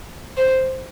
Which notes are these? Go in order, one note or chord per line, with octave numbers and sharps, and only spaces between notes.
C5